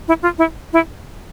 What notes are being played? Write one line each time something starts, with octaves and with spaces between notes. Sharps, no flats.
E4
F4
E4
E4